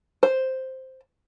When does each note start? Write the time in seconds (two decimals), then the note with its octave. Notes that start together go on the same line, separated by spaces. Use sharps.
0.23 C5